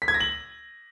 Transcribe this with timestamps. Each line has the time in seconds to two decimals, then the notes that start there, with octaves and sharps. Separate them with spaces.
0.02 B6
0.08 G#6
0.14 A#6
0.20 F#7